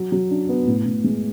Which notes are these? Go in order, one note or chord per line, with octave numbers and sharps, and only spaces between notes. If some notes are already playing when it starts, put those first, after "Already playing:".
Already playing: F#3
F#3
D4
B3
A2
A2
G#3